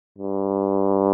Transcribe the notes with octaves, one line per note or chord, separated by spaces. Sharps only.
G2